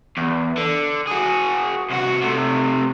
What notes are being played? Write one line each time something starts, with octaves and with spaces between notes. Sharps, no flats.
E2
D3
F#4 G#4
C2 F#4
C3 A3